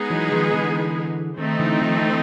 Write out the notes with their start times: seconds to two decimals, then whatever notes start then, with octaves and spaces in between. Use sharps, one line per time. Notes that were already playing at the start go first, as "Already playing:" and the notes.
Already playing: G#3 B3 D#4 G#4
0.10 E3 F#3
0.32 D#3 F3
0.54 D3 E3
1.38 D#3 A3 C4 D#4
1.59 D3 E3
1.81 D#3 F3
2.02 D3 E3